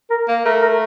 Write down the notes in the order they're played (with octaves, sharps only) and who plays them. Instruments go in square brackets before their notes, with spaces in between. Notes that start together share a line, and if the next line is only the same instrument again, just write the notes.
[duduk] A#4
[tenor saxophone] A#3
[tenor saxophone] A3 [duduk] A#4
[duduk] A#4